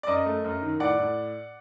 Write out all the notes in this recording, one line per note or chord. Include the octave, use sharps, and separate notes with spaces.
D5
F#2 D#5
A3
F#2
D#3
A2 D5 F#5
A2